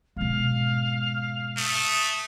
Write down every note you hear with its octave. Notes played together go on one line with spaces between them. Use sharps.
G#2 B2 F5
A3 D#6